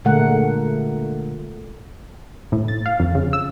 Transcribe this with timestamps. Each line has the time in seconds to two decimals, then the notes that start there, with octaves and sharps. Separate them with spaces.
0.05 A#2 D3 G#3 A3 A#4 F#5
2.52 A2
2.68 A6
2.86 F5
3.00 F2
3.15 C#3
3.33 E6